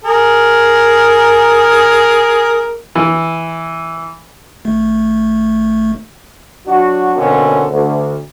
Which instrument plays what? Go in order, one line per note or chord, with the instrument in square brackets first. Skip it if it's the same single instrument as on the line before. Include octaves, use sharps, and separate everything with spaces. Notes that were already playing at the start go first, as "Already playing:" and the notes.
[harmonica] G#4 A#4
[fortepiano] E3
[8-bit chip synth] G#1 A3
[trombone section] F#3 D4 F#4
B2 D3 A#3 C4 C#4
D2